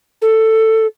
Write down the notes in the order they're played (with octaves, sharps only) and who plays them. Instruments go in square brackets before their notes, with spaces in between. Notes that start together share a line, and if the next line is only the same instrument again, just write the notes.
[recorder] A4